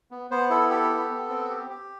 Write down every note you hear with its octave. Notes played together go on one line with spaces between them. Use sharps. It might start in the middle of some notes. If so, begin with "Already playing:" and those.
B3
B3 C5
E4 A4
G4 A4
B3
B3
C4
G4
G4